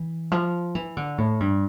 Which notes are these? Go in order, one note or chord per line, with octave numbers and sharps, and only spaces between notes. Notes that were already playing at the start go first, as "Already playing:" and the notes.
Already playing: E3
F3
E3
D3
A2
G2